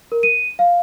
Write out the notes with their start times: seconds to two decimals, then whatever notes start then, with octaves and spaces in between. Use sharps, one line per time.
0.12 A#4
0.23 D#7
0.59 F5